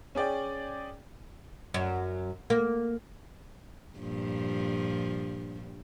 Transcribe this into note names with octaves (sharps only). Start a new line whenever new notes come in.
C#4 G#4 D5 G5
F#2
A#3
G2 A#2 F3